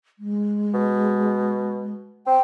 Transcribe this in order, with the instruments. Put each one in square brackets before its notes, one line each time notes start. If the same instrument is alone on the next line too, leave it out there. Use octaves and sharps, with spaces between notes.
[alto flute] G#3
[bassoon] B2
[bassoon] C4 [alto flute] G5